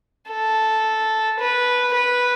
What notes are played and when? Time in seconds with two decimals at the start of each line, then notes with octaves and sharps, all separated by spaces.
0.30 A4
1.40 B4
1.94 B4